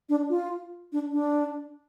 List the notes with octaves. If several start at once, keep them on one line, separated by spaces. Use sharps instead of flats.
D4
F4
D4
D4